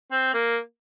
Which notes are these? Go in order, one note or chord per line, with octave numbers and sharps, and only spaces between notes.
C4
A#3